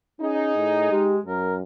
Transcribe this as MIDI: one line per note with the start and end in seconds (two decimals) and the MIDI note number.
0.21 0.56 61
0.21 1.13 63
0.21 0.90 68
0.56 0.88 45
0.91 1.20 56
0.91 1.18 67
1.26 1.62 42
1.26 1.54 70